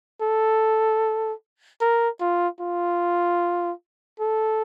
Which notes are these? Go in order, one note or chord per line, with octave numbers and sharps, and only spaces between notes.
A4
A#4
F4
F4
A4